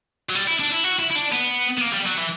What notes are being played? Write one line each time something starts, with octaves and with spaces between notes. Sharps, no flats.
F#3
G3
E4
D4
E4
F#4
E4
E4
D4
B3
B3
A#3
G3
F#3
E3